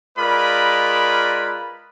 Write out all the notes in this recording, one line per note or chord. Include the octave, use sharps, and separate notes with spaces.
G#3 F4 A#4 B4 D5 B5